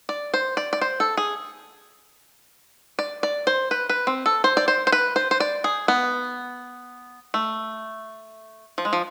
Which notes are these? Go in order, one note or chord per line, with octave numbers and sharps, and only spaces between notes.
D5
C5
D5
D5
C5
A4
G#4
D5
D5
C5
B4
B4
C4
A4
C5
D5
C5
C5
B4
C5
C5
D5
G#4
B3
A3
F3
G#3
F3